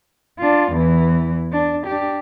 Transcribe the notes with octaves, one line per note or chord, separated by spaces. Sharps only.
D4 F4
E2 E3
D4
D4 G4